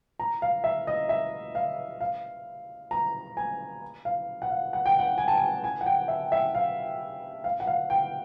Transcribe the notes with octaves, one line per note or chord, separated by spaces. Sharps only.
A#5
F5
E5
D#5
E5
F5
F5
A#5
G#5
F5
F#5
F5
F#5
G5
F#5
G#5
A5
G#5
G#5
F#5
G5
E5
E5
F5
F5
F#5
F5
G5